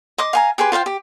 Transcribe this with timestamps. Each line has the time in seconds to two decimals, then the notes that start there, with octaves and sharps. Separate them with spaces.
0.18 D#5 C6 D6
0.33 F5 G#5 A#5
0.58 G4 G#4 B4 C6
0.72 F4 C5 F5 G5
0.86 G4